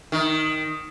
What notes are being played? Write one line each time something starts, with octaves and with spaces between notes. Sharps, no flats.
D#3